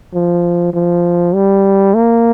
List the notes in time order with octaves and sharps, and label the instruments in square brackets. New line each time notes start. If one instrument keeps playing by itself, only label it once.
[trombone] F3
F3
G3
A#3